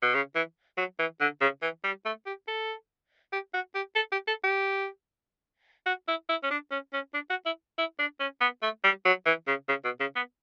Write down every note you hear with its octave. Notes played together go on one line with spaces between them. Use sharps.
B2
C#3
E3
F#3
E3
D3
C#3
E3
G3
A3
G4
A4
G4
F#4
G4
A4
G4
A4
G4
F#4
E4
E4
C#4
D4
C#4
C#4
D4
F#4
E4
E4
D4
C#4
B3
A3
G3
F#3
E3
C#3
C#3
B2
C#3
B3